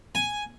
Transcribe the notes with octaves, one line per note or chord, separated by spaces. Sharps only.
G#5